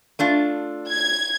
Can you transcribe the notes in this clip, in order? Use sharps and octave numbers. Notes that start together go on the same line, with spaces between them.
A3 D4 F4
G#6